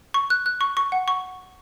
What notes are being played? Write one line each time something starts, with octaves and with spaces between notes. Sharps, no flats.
C#6
F#6
F#6
C#6
C#6
F#5
C#6